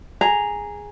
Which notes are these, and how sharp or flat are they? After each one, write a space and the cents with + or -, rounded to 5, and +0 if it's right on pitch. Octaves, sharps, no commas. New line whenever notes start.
G#4 -5 A#5 +0